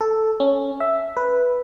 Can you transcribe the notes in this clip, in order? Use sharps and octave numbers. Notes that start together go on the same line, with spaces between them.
A4
C#4
E5
B4